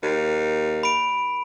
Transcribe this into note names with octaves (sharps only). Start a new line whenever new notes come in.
D#2
B5 D7